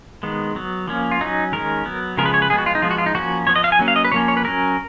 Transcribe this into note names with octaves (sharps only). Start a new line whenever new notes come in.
D#3 G#3 B3
F#3 B3
F3 A#3 C#4
F4
F#3 C#4 D#4
D#3 G#3 C#4 A#4
F#3 B3
C#3 F3 G#3 B3 A#4
B4
C#5
B4
F3 G#3 B3 G#4
F#4
F4
D#4
F3 G#3 B3 F4
F#4
F4
D#4
F3 A#3 C#4 F#4
F3 B3 C#5
D#5
F5
G#5
F#3 A#3 C#4
F5
D#5
B4
F3 A#3 C#4 C#5
C#5
B4
F#3 C#4 A#4